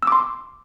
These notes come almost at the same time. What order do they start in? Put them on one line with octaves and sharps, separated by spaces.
E6 D6 C6